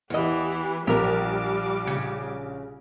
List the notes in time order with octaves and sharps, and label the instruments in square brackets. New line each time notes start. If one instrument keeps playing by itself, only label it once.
[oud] E2 D#5 [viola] E3 G4
[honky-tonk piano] A#1 [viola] G3 D6 [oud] G4 A#4
[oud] C#3